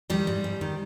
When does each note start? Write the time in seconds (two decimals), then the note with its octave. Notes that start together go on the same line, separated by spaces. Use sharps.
0.10 D#3 G3
0.27 G#2
0.44 G#2
0.61 D#3